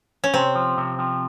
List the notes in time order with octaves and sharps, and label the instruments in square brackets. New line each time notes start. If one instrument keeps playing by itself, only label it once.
[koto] C#4
[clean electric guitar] C3 [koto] C4
[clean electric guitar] F3
C3
F3